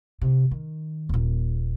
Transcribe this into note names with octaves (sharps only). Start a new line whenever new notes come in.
C3
D#3
D#1 A#2